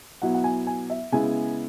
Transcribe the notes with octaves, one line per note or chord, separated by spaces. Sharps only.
B2 F#3 B3 E4 F#5
F#5
G#5
G#5
E5
C#3 G#3 B3 E4 G#5